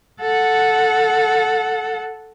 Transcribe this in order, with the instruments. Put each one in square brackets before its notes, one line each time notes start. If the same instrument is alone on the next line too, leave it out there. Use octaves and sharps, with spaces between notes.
[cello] A4 F#5